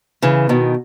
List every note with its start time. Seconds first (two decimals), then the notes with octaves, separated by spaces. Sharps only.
0.22 C#3 E3
0.49 B2 D#3